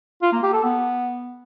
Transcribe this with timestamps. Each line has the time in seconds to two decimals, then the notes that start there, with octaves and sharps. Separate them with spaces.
0.22 F4
0.33 A#3
0.43 G4
0.53 A4
0.64 B3